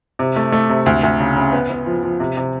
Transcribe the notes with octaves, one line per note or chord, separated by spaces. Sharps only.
C3
A3
A3
C3
D2
D2
C#3
C#3
B3
B3
F3
F3
C3
C3